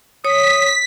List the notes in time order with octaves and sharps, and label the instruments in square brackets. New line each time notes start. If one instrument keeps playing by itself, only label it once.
[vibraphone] C#5 [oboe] D#6 [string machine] B6